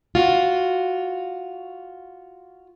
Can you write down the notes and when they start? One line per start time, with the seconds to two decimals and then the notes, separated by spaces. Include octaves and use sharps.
0.15 F4 F#4